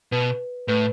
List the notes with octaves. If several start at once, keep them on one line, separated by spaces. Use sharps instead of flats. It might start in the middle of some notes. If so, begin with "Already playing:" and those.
B2 B4
A2 B4